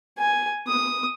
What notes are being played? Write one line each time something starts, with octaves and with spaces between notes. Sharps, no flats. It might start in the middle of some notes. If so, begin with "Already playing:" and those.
G#5
D#6